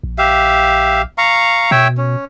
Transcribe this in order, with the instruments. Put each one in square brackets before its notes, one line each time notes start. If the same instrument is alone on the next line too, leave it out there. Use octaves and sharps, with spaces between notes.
[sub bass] A#1
[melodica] G4 E5 F5
F5 A#5 C#6
[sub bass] B2 [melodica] C#5 E5 G5
[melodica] C#4